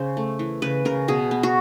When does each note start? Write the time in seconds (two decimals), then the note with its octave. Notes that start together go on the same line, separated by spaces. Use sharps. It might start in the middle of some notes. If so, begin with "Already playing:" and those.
Already playing: C#3 C5
0.17 A3
0.39 E3
0.62 C#3 B4
0.85 C#3 A#4
1.08 B2 G#4
1.31 B3
1.43 F#4